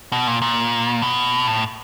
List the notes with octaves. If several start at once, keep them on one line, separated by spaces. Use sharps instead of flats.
B2
A#2
A#2
B2
A2